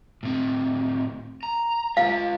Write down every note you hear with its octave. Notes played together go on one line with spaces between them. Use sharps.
A2 C4
A#5
G#3 F4 F5